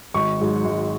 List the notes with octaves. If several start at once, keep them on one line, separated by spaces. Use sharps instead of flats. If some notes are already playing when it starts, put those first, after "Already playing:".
G#1 C#6
G#2 F#3
G#1